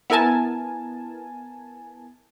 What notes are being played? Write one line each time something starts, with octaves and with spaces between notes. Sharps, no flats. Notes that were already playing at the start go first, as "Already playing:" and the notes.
B3 E4 A#4 G#5 A5